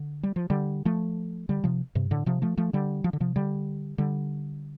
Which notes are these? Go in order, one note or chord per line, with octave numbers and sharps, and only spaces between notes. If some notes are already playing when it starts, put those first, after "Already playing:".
Already playing: D3
G3
F3
D3 G3
F3 A3
D3 G3
C3 F3
G2 C3
A2 D3
C3 F3
F3 A3
F3 A3
D3 G3
F3
D3
C3 F3
D3 G3
D3 G3